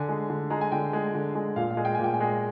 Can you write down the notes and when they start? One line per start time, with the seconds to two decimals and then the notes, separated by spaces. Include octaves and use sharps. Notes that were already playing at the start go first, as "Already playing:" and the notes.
Already playing: D3 G#5
0.09 G#3
0.30 D3
0.50 G#3 A#5
0.61 G#5
0.72 D3 G5
0.93 G#3
1.15 D3
1.35 G#3
1.56 A#2 F5
1.71 F5
1.77 G#3
1.85 G5
1.95 A#2 G#5
2.04 G5
2.14 G#5
2.20 G#3 G5